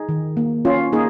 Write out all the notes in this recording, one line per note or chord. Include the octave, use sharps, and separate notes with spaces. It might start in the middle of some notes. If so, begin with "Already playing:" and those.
Already playing: D#4 G#4
D#3
A#3
C#4 F4
A#3 D#4 G#4